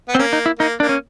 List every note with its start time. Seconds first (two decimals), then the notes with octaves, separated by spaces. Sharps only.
0.08 B3
0.15 C4
0.19 A#3 C#4
0.33 D#4
0.46 E4
0.59 A#3 D#4
0.80 A#3 D4
0.89 C#4